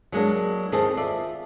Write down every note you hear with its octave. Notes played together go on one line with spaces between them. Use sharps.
F#3 G#3 A#3 D4
D#2 D#3 C4 G#4 A4 D#5
F4 D5 E5